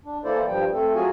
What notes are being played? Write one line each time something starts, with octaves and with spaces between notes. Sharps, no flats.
D4
E3 A#3 E4 A4 C5 D5
G2 F3 G3 G5
A3 C4 A4
F#3 F4 F#4 G#4 G#5